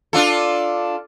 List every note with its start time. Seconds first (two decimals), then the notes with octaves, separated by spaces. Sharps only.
0.13 D4 F4 A4